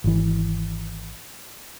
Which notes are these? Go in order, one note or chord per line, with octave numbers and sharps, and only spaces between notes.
G#1 E3